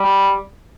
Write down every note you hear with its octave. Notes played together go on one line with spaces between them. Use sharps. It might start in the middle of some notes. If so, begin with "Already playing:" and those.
Already playing: G3